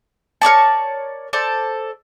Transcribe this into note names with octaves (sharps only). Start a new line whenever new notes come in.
A#4 C#5 D5 A5
A4 C5 D5